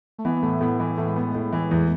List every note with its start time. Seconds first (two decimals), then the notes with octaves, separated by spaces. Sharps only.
0.19 A3
0.25 E3 B3
0.36 B3
0.42 A2 A3
0.61 A2 B3
0.80 E3 B3
0.97 A2 A3
1.07 G#3
1.15 A3 B3
1.35 A2
1.53 E3
1.71 E2